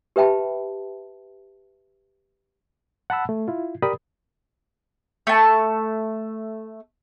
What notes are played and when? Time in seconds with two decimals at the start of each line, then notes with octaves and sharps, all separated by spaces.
0.16 G4 B4 E5 G5 A5 B5
3.10 F#5 A5 B5 E6
3.29 A3
3.48 E4 F4
3.82 G4 A#4 D5 B5 D#6
5.27 A3 A5